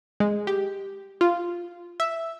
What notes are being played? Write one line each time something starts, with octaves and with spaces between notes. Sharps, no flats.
G#3
G4
F4
E5